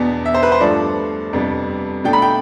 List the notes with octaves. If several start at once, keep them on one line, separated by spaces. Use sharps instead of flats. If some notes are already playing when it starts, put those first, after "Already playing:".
Already playing: E2 B2 B3 D4
E5
C5
B4
C5
G2 F3 A3 D4 D5
F2 C3 G3 B3 D4
B2 A3 D4 G5
B5
G5